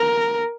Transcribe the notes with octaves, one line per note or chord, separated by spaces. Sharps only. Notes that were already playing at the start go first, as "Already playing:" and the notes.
Already playing: A#4